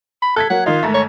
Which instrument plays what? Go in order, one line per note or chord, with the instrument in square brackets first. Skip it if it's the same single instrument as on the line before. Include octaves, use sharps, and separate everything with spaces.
[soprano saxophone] B5
[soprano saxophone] A4 [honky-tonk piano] F#6 G#6 B6
[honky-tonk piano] F#3 A#3 [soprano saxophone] F#5
[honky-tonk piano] D#3 D#4 [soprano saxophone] F4
[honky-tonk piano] G#2 D#3 A3
[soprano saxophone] C#5